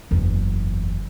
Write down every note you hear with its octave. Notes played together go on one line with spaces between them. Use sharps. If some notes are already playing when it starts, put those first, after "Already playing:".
F#1 E2